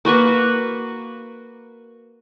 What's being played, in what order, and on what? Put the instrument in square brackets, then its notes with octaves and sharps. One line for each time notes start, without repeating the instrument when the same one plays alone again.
[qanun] A#3 F#4 B4 C#6